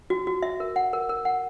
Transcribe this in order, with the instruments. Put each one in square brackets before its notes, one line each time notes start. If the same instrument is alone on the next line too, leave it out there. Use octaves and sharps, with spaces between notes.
[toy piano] F#4
F#4
E5
A#4
F#5
A#4
A#4
F#5